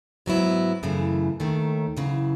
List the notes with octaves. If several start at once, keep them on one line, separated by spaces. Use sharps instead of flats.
G#2 F#3 B3 E4
F#2 C#3 E3 A3
D#2 D#3 A3
F#2 C#3 E3